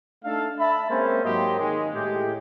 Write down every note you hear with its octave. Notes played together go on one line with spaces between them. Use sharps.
A3 D4 D#4 A4 F5
E5 A5 B5
G#3 A#3 C4 C#4 C5
G#2 F#3 A#3 G4 D#5 C6
D#3 G#3
A2 G#3 G4